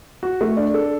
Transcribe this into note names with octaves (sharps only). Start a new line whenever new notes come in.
F#4
A3
D4
A4